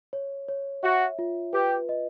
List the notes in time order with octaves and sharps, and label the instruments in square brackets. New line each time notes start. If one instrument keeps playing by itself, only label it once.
[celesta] C#5
C#5
[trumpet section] F#4 [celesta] E5
[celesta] F4
[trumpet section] G4 [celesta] B4
[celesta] D#5